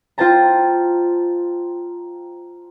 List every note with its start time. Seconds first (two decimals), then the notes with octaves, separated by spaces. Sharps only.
0.18 F4 C5 G5 A5 A#5